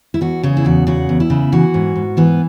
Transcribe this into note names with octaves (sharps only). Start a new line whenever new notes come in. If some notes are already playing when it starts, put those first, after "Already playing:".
E4
E2 F#4
C#3 G#4
E4
E2 F#4
C#3 F#4
E2
E4
C#3
E3 F#4
G#2
G#2
E3 B3